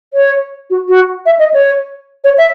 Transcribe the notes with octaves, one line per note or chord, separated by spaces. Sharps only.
C#5
F#4
F#4
E5
D#5
C#5
C#5
E5